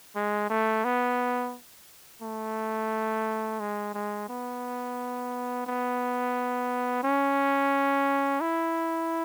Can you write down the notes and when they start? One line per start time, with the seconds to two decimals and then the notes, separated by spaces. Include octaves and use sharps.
0.16 G#3
0.50 A3
0.84 B3
2.22 A3
3.60 G#3
3.94 G#3
4.29 B3
5.66 B3
7.03 C#4
8.41 E4